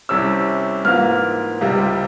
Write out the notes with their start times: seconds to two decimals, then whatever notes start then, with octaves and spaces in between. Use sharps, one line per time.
0.09 C2 C3 G3 C#4 E6
0.85 G#2 E3 A#3 F4 F6
1.61 C#2 C3 G3